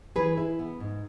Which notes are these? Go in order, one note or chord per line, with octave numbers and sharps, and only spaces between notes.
E3 G#4 B4
E4
B3
G#2